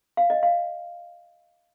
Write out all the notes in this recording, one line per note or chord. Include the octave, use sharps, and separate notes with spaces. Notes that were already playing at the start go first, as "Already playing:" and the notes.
F5
D#5
F5